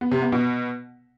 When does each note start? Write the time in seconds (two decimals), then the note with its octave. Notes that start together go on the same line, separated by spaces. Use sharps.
0.01 B3
0.12 C3
0.22 B3
0.32 B2